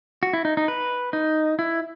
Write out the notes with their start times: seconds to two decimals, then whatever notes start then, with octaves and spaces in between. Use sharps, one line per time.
0.23 F#4
0.33 E4
0.45 D#4
0.57 D#4
0.68 B4
1.13 D#4
1.59 E4